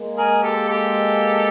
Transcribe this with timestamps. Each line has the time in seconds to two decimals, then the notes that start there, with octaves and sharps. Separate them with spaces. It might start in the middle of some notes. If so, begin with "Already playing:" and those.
Already playing: G#3 A#3
0.18 G#4 A#4
0.43 G4 A4
0.68 G4 A4